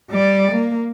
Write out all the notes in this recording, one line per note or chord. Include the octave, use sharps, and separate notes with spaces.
G3 D5
A#3